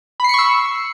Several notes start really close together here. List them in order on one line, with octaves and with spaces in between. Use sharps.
B5 C7 C#7 C#6 E6